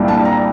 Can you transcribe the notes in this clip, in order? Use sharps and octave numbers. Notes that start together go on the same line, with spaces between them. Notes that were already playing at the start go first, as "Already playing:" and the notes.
Already playing: C2 A#2 G3 D4
A5
A#5